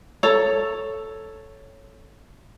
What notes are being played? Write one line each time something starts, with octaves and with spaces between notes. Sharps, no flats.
A4 C#5 A#5